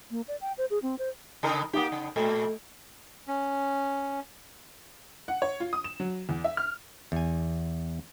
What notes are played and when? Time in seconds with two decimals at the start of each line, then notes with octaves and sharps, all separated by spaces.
0.11 A#3
0.28 D5
0.41 G5
0.58 C5
0.70 G#4
0.82 C4
0.99 C5
1.43 C#3 D#4 A#4
1.73 A#3 D#4 G4 F#5 D#6
1.92 C#3
2.16 A#2 A3
3.28 C#4
5.28 F#5
5.42 C#5
5.60 F4
5.73 D#6
5.84 E7
6.00 F#3
6.29 E2
6.44 E5
6.57 F6
7.12 E2 G#5